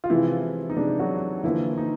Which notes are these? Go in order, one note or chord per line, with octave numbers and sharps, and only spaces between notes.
F4
C3 E3 F3 G#3 E4
D#4
C3 F3 G#3 D4
F#3 F#4
D3 E3 F3 A#3 E4
D#4